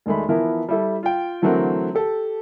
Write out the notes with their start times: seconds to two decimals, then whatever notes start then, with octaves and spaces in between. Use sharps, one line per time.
0.06 E1 D#3 G#3 A3 B5
0.29 E3 F3 B3 E4 A#4
0.68 G3 E4 A4
1.03 F4 G5
1.42 D3 E3 F#3 A3 C4 A#4
1.95 G4 A4